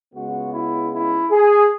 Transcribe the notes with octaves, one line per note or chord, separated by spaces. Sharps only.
C#2 C#3 G#3 B3 F#4
E4
E4
G#4